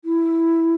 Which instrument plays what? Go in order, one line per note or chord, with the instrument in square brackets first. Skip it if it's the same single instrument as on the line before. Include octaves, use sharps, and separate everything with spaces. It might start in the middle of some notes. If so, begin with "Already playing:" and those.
[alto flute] E4